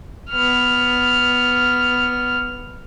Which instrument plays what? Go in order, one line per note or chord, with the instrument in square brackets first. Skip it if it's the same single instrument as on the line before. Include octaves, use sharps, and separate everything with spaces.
[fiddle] B3 F6